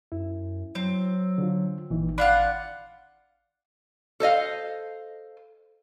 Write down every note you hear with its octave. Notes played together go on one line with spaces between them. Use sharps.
F#2 E4
F#3 C4
D3 F4
G#1 A#2 E3 D#4
D4 F4 F#5 B5
A4 C5 D#5 F5